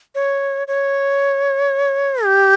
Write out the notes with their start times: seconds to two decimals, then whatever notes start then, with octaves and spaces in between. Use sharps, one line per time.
0.15 C#5
0.68 C#5
2.24 G4